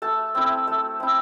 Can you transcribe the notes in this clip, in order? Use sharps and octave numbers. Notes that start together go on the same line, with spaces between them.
A3 A5
C4 E4
A3
C4 E4